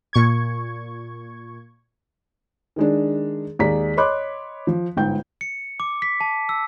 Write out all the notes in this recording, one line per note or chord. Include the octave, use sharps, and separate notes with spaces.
A#2 C#6 G#6
D#3 G#3 D4
D#2 G#3 G#4 D5 A#5 B6
C#5 D#5 B5 C6 D6 F#6
F3
G1 G#2 G5 G6
C#7
D6
B6
A5
E6